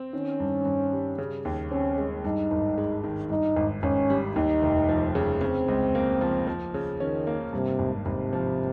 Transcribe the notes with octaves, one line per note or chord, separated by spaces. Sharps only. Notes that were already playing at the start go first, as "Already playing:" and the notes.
Already playing: C4
D#3 C#4
G2
G2
G3
C#3
D#2
C4 C#4
G#3
G2 D#4
G#1
G#3
D#3
G2 D#4
G#1
G#1 C#4
G3
D#2 D#4
F1
F3
C#3
C#3 C4
C#2
A#3
F3
F3
C#3
D#3 C#4
A#3
G2 C3
G#1
G#1 C3
F3